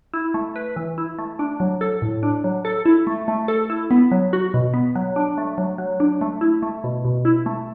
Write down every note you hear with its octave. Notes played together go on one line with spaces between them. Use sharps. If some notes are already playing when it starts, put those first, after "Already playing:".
E4
A3
B4
E3
E4
A3
D4
F#3
A4
A2
D4
F#3
A4
E4
A3
A3
A4
E4
B3
F#3
F#4
B2
B3
F#3
D4
A3
F#3
F#3
D4
A3
E4
A3
B2
B2
E4
A3